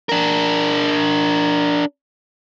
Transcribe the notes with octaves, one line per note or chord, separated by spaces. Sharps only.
D4 A#4